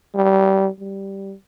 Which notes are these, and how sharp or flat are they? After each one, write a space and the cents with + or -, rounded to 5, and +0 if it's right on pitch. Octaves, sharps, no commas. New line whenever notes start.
G3 -25
G3 -5